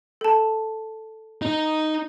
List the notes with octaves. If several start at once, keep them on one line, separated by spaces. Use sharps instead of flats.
A4 A5
D#4